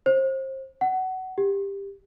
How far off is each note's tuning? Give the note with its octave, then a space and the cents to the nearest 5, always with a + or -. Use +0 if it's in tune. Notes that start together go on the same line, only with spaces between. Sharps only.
C5 +30
F#5 +20
G4 +15